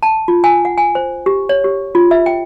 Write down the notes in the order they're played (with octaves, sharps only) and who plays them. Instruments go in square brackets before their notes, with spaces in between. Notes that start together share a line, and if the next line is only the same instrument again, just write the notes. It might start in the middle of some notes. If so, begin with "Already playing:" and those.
[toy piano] A5
F4
G#5
F#5
G#5
C5
G4
C#5
G4
F4
E5
G5